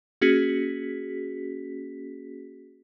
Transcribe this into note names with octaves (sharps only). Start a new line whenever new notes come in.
A#3 C#4 F#4 G#4 B6